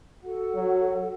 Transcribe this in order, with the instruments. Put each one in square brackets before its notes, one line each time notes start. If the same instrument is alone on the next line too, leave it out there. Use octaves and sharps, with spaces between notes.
[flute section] F#4 A4 F#5
[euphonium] F#3